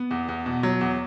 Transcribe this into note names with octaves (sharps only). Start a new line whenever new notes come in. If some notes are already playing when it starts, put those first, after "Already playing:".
Already playing: B3
E2
E2
B2
F#3
E2